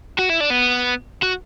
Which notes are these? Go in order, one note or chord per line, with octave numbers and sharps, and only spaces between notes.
F#4
E4
D4
B3
F#4